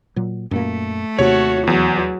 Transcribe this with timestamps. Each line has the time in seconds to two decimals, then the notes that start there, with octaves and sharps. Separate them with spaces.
0.16 A#2 F#3
0.51 F#2 A#2 A3 A#3
1.19 D#2 C3 F#4 C#5
1.67 E2 F#3